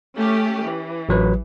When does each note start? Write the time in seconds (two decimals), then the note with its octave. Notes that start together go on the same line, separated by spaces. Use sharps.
0.18 A3 C#4 G4
0.66 E3
1.09 A1 F#3 B4